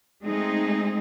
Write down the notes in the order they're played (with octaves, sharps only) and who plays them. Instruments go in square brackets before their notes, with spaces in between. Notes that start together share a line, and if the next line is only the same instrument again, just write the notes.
[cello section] G#3 A3 C4 D#4 G#4